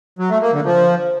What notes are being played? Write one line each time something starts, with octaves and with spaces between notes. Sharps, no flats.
F#3
A3
A#3
D3
F3